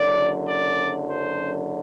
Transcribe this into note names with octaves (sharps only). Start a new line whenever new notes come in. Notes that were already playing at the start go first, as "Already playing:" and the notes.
Already playing: F#1 F#2 D3 D5
D5
C5